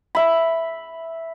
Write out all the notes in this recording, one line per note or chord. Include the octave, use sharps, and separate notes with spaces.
E5 B5